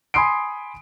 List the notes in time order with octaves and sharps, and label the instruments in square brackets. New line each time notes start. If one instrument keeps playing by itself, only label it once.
[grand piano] G#5 B5 C6 D#6 C7 D7